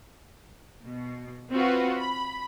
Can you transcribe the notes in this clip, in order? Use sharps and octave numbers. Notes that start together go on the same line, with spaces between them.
B2
C4 F4 F#4 B4
B5